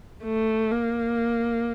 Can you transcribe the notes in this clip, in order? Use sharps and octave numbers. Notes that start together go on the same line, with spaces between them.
A3
A#3